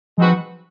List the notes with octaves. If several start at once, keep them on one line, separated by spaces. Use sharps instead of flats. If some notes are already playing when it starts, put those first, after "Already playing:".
F3 G#3 C4 D#4 F#4 B4